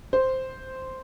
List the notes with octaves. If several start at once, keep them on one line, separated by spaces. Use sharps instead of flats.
C5